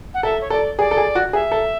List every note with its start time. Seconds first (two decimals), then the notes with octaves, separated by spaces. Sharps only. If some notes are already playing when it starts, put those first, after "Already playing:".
0.14 F#5
0.23 A4 E5
0.40 C#5
0.50 A4 D5
0.78 G#4 D5
0.91 A4
0.97 G#4
1.15 F#4
1.33 G#4 E5
1.52 A4